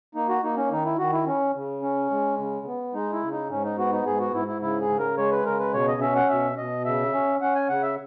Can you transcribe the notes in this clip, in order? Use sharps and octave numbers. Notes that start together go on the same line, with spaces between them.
A#3 D#4
F#4
A#3 D#4
C#4
D#3 D#4
E4
D#3 F#4
E4
C#4
C#3
C#4
G#3
C#3
B3
G#3 D#4
E4
C#3
D#4
G#2 C#4
D#4
B3 F#4
D#4
G#2 G#4
F#4
G#2 E4
E4
C#3 E4
G#4
C#3
A#4
G#3 C#5
B4
C#3 A#4
B4
B2 C#5
D#5
C#4 E5
F#5
B2 E5
B2 D#5
C#3 E5
C#4
C#4 F#5
G#5
C#3 F#5
E5